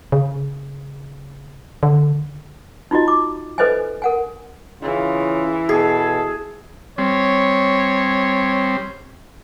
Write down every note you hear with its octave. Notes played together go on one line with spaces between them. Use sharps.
C#3
D3
D#4 F4 F#4 D#5
D6
A4 B4 C5 D#5 E5 G#5
A#4 F#5 G#5
C#3 E3 F4
B2 G#4 A4
G3 C4 C#5